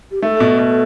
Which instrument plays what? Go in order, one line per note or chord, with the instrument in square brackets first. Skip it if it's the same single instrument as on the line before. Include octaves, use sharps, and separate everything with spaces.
[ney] G4
[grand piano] A3 [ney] A4
[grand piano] B2
B2